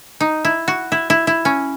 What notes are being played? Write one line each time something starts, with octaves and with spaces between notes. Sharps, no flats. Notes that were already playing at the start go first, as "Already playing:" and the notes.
D#4
E4
F#4
E4
E4
E4
C#4